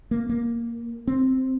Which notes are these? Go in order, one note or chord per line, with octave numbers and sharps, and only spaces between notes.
A#3
A#3
C4